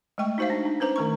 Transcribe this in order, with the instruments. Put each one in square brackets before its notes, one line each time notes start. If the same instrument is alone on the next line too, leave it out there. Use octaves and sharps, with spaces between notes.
[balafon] G#3 A3 G5 C#6
D#4 F#4 C5 E5 F5
D4
D#4
C#4 B4 C5 A#5
D#3 A3 C#6